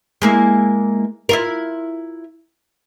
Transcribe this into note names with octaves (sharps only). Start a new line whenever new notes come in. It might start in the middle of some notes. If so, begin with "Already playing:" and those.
G#3 A#3 E4
E4 F4 A#4